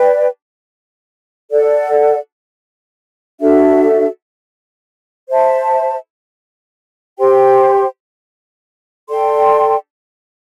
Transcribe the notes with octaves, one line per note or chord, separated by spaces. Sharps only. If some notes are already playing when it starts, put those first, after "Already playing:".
Already playing: B4 D5 G5
A4 D5 F#5
D4 F#4 A4 E5
C5 E5 A5
G4 C5 G5 C6
A4 D5 G5 C6